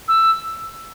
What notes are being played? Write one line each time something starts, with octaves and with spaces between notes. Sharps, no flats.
E6